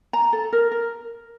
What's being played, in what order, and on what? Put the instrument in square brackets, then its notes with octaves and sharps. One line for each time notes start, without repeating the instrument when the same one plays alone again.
[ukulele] A#5
A4
A#4
A#4